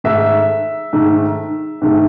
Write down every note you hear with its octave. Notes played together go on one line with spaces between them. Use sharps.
G#2 D#3 A3 E5
G#2 D#3 A3
G#2 D#3 A3